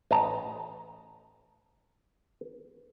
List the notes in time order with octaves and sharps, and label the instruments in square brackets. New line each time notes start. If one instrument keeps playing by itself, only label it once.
[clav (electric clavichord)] A1 D#5 A5 A#5